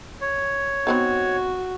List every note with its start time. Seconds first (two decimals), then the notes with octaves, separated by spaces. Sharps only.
0.21 C#5
0.87 B3 C4 D#4 F#4